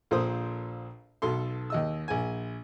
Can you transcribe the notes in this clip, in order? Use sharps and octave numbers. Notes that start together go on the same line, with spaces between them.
A#1 A#2 A4 C5 D#6
B1 B2 A4 C6
D#2 D#5 E6
A#1 G#5